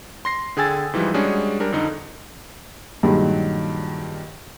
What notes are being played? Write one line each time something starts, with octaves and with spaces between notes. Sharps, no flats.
C6 A#6 C7
D3 G#4 G5 G#5 E6 A6
G#2 E3 F3 G3
G3 G#3 C#4 D4 F#4 G#4
G3 D4 A#4
F2 D3 D#4
G2 A#2 D#3 F#3 G#3